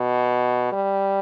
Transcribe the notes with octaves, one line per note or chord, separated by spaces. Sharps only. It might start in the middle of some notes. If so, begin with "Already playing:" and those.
Already playing: B2
G3